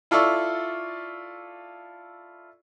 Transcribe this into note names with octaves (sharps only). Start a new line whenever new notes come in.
E4 F4 A4 D5 C#6 E6